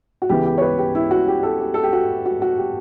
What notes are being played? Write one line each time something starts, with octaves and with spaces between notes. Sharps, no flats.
F#4
C#2 C#3 E3 B3 G4
G4
C#5
B4
G4
E4
F#4
G4
A4
G4
A4
G4
F#4
F#4
F#4
G4